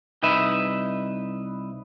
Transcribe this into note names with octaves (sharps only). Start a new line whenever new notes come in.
C2 D#4 B4 E5